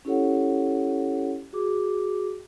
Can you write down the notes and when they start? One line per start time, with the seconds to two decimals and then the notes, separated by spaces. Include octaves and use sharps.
0.05 C#4 E4 G4 A4 C#5 F#5
1.53 F#4 G#4 D6